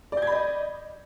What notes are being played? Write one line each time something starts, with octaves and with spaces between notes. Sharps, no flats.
D5 D#5 B5 G6 G#6